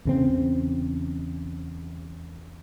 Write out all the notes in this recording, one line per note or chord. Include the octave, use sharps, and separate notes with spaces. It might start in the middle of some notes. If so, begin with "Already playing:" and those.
E2 C#3 C4